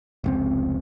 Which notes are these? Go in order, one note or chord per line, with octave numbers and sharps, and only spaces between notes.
F1 C#2 C4